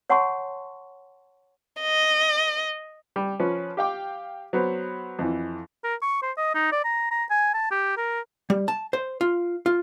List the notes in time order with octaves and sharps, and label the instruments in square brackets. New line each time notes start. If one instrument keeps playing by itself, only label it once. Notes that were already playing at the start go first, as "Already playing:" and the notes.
[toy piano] C#5 F#5 G#5 A5 C6 C#6
[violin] D#5
[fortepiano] G3
F3 C#4 B4
G4 F5 G5 D6
F#3 B3 C5
F2 E3
[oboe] A#4
C#6
C5
D#5
D#4
D5
A#5
A#5
G#5
A5
G4
A#4
[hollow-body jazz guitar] G3
A5
C5
F4
F4